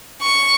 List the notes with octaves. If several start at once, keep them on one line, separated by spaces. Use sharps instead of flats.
C#6